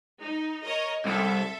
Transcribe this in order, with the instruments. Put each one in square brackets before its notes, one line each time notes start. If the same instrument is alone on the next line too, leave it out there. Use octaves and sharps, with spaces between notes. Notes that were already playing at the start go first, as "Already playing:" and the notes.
[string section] D#4
A#4 C#5 D#5
[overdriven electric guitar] C2 [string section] A4 E5